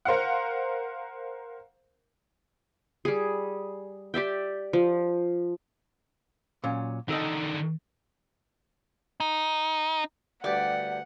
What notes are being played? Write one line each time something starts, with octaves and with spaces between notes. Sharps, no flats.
A#4 C5 F5 F#5
G3 G#4
G4 D5 E5 G5
F3
A#2 F#3 C#4
D3 D#3 D#4 A4 D#5
D#4
D2 G2 G4 D5 F#5